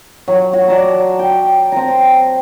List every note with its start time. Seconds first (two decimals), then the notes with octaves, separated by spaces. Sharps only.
0.28 F#3
0.53 F#4
0.68 D5 A5 A#5
1.19 G5
1.72 C4 A#5